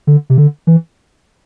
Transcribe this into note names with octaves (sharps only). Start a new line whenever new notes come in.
D3
C3
D3
E3